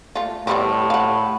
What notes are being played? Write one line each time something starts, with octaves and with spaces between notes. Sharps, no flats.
A3 F4
A2 G3 B3 C4
F5 F#5